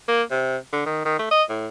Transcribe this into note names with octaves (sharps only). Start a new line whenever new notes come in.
A#3
C3
D3
D#3
D#3
A3
D#5
A2